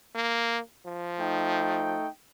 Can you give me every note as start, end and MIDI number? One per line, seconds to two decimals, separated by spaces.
0.15 0.59 58
0.86 1.98 53
1.20 2.07 57
1.20 2.07 63
1.20 2.07 79